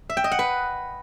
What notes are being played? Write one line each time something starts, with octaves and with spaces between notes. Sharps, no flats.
E5
G5
D#5
F#5
B4